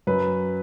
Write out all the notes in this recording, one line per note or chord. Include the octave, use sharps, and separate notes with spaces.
F#2 B4